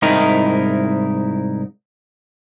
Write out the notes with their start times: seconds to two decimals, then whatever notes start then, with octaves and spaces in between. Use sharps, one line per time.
0.02 C2 G#2 D#4 E4 A#4 D#5